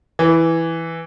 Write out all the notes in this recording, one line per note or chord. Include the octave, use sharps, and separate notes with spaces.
E3